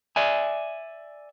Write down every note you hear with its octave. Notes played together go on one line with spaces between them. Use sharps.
D5 E5 G#5